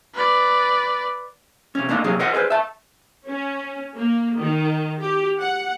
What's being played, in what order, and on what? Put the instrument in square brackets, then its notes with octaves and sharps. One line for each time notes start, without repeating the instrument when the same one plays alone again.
[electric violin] B4 D5
[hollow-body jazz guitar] C3 C#4
A3 A#3 D4 D#4
C3 F#3 A#3 G#4
A#4 C5 D#5 F#5
G#4 A4 B4 C5
E5 A5
[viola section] C#4
A#3
D#3
G4
F#5